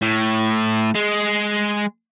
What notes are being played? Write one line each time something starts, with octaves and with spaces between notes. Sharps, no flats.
A2
G#3